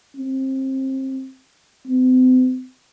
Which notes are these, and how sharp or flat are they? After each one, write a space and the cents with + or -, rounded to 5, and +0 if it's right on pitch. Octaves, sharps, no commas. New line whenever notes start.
C4 +25
C4 -45